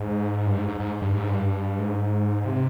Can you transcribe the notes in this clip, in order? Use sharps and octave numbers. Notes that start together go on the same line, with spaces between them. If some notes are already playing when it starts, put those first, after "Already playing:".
Already playing: G#2
G2
G#2
G#2
G#2
G2
G#2
G2
G#2
C3